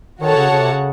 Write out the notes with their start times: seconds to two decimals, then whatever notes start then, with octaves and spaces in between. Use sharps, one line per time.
0.21 D#3 F#4 A4 C#5 F#5 A5
0.36 C#3
0.50 C#3
0.61 C3
0.73 C#3